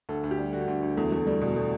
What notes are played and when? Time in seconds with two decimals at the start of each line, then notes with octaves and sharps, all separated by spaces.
0.09 D2 A4
0.24 D2
0.31 G4
0.38 G3
0.53 D3 F#4
0.68 D2
0.83 D2
0.97 E2 A3
1.12 E2 A3
1.27 G3 A3
1.41 B2 G3
1.56 A3